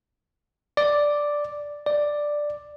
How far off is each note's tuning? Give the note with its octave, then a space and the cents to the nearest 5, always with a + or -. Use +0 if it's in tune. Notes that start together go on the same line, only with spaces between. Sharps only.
D5 +0
D5 +5